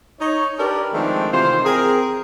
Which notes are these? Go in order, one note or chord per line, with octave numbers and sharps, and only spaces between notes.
D#4 C#5
D4 G4 A#4 B4 D5
D#3 F3 G#3 A3 C4 D4
C3 D#3 E3 F4 C5
C4 G#4 A#4